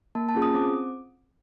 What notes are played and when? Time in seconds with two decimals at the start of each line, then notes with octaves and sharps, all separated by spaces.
0.15 A#3 A5
0.29 A5
0.35 C#4 F4 G#4
0.42 D#6
0.54 C4 D6